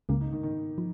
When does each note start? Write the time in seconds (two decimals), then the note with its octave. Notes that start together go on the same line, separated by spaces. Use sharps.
0.09 C#2 C#3 G#3 A#3
0.21 D#4
0.32 D#3
0.43 D#3
0.78 F3